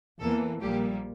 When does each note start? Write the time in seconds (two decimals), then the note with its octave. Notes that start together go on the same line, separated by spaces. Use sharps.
0.20 E2 E3 A#3 A4
0.60 A#1 A#2 G3 A#3 G4